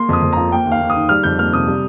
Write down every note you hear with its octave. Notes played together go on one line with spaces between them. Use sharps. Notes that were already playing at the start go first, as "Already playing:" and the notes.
Already playing: A#3 C6
F2 D#6
F2
F3 A#5
A#3 G5
D#2
F5
D#2
D#6
D#3
G3 F6
F2 G6
A#3 F6
C3 D#6
G3